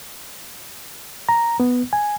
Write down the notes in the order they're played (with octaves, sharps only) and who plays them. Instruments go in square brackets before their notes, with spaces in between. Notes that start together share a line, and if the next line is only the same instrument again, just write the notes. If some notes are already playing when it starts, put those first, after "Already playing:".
[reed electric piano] A#5
B3
G#5